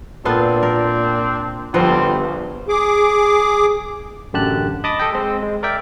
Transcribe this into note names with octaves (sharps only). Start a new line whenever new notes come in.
A#2 B3 C4 D4 F4 A4
A#4
G1 E2 F3 G3 B3 C4
A#1
G#4 D6
A1 F#2 D3 G4 A5 F#6
D#5 A5 B5 D6 D#6
A4 D#5 G5
G#3 C4
G#3
A#4 D5 E5 G5